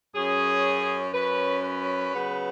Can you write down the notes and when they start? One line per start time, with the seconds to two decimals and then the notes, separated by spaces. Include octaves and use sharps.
0.16 F#2 F#3 C#4 G#4
1.13 F#2 F#3 C#4 B4
1.63 B4
2.12 C#3 F#3 B3